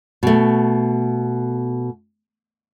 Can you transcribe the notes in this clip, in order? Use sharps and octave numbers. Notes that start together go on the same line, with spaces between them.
B2 A3